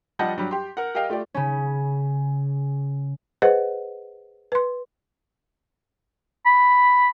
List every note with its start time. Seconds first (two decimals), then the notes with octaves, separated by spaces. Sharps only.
0.19 F3 G3 D#5 F#5 A5 G6
0.36 G2 F#3 G3
0.51 G4 C6
0.77 A#4 F#5
0.95 G4 A#4 D#5 F5 G5
1.10 A3 F4 G4 D5
1.34 C#3 C#4
3.42 G#4 B4 C5 D#5 F#5
4.52 B4 C6
6.46 B5